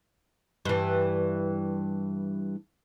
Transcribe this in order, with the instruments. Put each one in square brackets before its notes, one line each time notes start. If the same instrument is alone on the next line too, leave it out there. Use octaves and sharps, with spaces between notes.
[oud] G2 E3